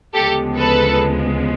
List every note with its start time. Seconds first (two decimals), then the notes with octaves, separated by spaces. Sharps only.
0.15 D2 C#3 F3 G#3 B3 G4 A4
0.57 A4 B4